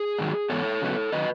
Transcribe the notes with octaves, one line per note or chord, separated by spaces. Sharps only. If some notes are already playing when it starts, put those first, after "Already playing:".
Already playing: G#4
G#2 D#3 F#3
G#2 E3 B3 A4 C#5
C#3 F#3 B3
D#3 F#3 B4 D#5